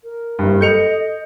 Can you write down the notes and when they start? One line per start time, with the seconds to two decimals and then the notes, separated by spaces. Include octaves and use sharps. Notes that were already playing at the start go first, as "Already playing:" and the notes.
0.03 A#4
0.39 F#1 G2
0.61 A4 D#5 G6 C#7 F7